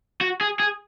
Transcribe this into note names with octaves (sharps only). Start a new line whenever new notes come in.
F#4
G#4
G#4